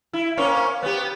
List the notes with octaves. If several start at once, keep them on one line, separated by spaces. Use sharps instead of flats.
E4
A#3 C4 C#4
B3 G4